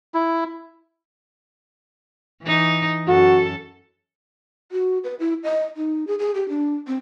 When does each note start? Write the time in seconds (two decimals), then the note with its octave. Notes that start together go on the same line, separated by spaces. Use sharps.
0.14 E4
2.43 E3 D#4
3.08 F#2 F#4 A4
4.72 F#4
5.04 B4
5.19 E4
5.44 D#5
5.77 D#4
6.07 G#4
6.19 G#4
6.35 G4
6.49 D4
6.87 C4